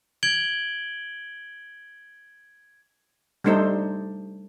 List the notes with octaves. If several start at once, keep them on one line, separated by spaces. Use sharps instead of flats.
G#6 D7 F#7 G7
G3 A3 D4 D#4 C5